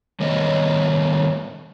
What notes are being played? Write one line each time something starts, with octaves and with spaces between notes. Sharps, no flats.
D#3 G3 A3 B3 C#5 D#5